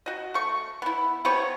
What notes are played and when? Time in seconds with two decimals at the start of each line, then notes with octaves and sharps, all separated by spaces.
0.06 F#4 D#5
0.34 A3 C#6
0.82 B3 E4
1.25 C3 B3 C#5 C#6